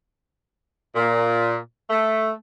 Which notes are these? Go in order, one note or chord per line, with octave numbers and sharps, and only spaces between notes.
A#2
A3